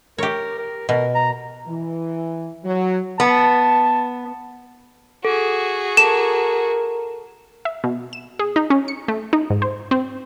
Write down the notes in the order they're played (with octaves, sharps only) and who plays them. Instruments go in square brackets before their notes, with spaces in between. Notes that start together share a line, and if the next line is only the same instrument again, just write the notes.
[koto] G4 C#5 [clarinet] A#4
[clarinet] A#4
[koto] B2 [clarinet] A#4
[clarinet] A#5
[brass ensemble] E3
F#3
[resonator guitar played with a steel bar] B3 [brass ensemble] A5
[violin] F#4 G#4 [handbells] A4
[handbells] A4 A5 [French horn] A#4 [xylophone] E7
[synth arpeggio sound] E5
B2
E7
G#4
D#4
C#4
C#7
A3
D#4
G#2
C5
C4